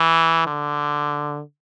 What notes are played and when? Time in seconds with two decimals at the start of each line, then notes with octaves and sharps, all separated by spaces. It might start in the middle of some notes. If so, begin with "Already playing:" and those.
Already playing: E3
0.46 D3